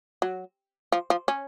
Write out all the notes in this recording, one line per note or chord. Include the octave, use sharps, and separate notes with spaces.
F#3
F3
F3
C#4